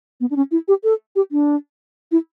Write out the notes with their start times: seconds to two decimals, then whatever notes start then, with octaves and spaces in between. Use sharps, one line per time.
0.20 B3
0.31 D4
0.36 C#4
0.51 E4
0.68 G4
0.84 A4
1.16 G4
1.32 D4
2.12 E4